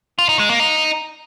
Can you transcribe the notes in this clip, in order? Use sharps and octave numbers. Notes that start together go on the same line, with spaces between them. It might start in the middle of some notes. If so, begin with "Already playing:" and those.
F4
D#4
G#3
A#3
D#4